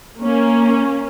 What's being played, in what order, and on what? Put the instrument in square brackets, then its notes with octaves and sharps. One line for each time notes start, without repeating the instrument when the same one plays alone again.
[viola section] A#3 C#4